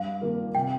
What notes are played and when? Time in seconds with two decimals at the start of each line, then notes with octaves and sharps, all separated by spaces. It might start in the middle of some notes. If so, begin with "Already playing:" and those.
Already playing: G2 F5
0.21 D#3 A#3 F4 A#4
0.55 C3 G5